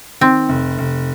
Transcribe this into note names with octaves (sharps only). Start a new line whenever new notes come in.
D#3 C4
F1
F1